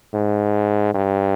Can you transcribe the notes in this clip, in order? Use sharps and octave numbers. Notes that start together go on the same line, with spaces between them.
G#2
G2